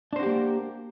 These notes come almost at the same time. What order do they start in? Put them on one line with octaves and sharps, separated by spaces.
D4 C5 F#4 G4 A#3